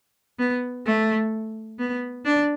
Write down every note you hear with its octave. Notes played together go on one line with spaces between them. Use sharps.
B3
A3
B3
D4